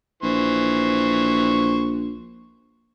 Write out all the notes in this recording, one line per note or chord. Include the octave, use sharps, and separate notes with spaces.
A#1 E3 C5 C#6